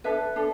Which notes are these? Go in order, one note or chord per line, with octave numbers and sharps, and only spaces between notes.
D4 A4 B4 E5
D4 A4